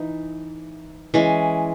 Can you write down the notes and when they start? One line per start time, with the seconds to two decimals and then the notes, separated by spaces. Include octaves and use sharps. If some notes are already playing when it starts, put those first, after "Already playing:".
Already playing: E3 D#4
1.14 E3 G#3 C#4